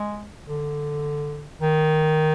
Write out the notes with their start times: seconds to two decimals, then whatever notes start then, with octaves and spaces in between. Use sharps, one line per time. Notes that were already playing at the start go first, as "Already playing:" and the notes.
Already playing: G#3
0.44 D3
1.61 D#3